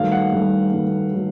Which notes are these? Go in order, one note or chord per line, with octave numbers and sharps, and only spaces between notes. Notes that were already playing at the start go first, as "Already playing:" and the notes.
Already playing: G2 D#3 F#3 A3 F5
F#5
G2 D#3 F#3 A3
G2 D#3 F#3 A3
D#3 F#3 A3